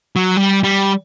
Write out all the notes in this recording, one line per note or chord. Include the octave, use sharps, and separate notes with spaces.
F#3
G3
G3